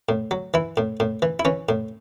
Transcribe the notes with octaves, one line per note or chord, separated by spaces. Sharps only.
A2
F#3
E3 E4
A2
A2
E3
E4
E3 C#4
A2